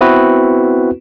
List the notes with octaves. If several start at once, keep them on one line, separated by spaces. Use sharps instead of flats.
B3 C4 E4 F#4 B4